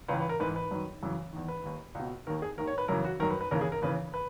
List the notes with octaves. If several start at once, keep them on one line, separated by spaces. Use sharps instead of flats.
C#2 C#3 E3 B4
B4
A#4
G#2 E3 B4
B4
F#2 D#3
F#2 C#3 E3
E2 D#3
B4
D#2 D#3
C#2 B2
D#2 D#3 A#4
G#4
D#2 D#3 A#4
C#5
B4
F#2 C#3 E3 A#4
F#4
F#2 D#3 A#4
B4
B4
D#2 C#3 E3 A#4
G#4
A#4
D#2 C#3 E3 B4
B4